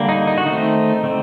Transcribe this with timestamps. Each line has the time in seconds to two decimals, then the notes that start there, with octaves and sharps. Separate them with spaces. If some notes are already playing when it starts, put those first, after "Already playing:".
Already playing: D3 G3 A#3
0.09 D#4
0.27 D#4
0.38 F#4
0.46 D#3 A3 C4 D#4
1.03 D3 A3 C4